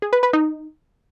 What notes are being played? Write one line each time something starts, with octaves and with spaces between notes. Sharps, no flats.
G#4
B4
B4
D#4